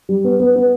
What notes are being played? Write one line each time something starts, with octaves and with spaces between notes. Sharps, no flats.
G3
B3
B3
B3